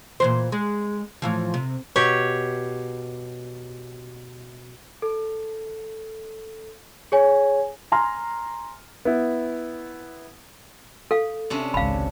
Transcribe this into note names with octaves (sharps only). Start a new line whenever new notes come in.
A#2 E3 C5
G#3
A2 E3 F3
C3
B2 G4 C#5
A4
G#4 C#5 G#5
G#5 A#5 C6 F6
B3 E4
A4 F5
C3 C#4 D4
G#1 C#2 F5 B5